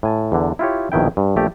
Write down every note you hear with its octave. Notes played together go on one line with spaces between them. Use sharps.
A2 G#5 A5
E2 D3
E4 F4 G4 C#5
A#1 B2 D#3 E4 G5
G2
A#1 A3 G4 D5